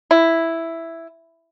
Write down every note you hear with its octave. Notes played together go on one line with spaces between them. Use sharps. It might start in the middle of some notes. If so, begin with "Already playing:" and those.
E4